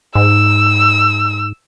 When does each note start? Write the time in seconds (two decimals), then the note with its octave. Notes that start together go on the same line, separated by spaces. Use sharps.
0.15 G#2 E6